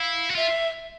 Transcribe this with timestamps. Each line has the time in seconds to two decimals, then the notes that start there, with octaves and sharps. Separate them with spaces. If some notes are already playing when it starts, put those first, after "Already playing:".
Already playing: E4 F5
0.30 F#4
0.35 F4 E5